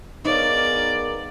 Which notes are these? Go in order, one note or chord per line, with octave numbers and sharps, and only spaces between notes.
B3 D#4 G#4 A#4 C#5 D5 F5